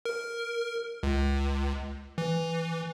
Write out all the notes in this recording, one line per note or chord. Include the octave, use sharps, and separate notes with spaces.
A#4
C#2
E3